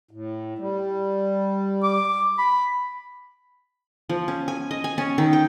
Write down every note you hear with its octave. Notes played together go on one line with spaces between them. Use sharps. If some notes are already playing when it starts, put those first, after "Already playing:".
A2
G3
D6
B5
F3
C#4
G#5
D#5
G#5
C#4
D#3
G5